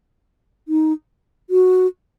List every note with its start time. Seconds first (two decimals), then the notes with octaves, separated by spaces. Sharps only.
0.68 D#4
1.50 F#4